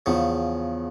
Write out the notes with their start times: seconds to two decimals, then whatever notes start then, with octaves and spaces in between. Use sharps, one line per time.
0.06 E2 C#3 F3